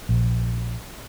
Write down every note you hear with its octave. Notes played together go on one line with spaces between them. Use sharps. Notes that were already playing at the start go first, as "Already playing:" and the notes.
A#1